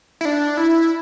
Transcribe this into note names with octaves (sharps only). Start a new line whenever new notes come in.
E4
D4
E4